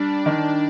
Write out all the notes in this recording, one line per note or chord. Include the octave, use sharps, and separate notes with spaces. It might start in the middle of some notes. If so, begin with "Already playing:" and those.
Already playing: G3 D4
D#3